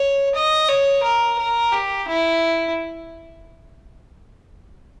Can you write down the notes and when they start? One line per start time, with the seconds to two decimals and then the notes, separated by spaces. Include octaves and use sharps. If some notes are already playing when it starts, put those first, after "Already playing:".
Already playing: C#5
0.35 D#5
0.68 C#5
1.03 A#4
1.39 A#4
1.72 G4
2.08 E4